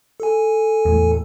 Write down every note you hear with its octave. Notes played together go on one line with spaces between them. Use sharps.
A4 G#5
E2 A2